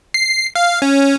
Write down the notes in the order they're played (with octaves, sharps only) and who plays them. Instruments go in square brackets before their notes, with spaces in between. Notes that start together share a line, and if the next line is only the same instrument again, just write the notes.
[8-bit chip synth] C7
F5
C#4